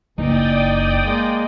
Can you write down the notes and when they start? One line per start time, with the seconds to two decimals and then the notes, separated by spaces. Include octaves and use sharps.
0.18 F#1 E3 D#4 D5 G5 D#6
1.03 G#3 A#3